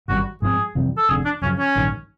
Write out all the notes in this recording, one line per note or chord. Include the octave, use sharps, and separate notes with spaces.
G#1 F#2 D3 G3 F#4
G#2 F3 G#3 C4 G#4
F2 C3 E3 G3
A4
F1 F2 D3 G#4
D4
F#2 C#3 F3 C#4
C#4
A#1 G#2 D#3 G3